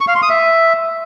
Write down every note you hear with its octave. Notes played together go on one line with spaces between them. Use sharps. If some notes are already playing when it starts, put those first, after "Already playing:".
C#6
F5
C6
D#6
E5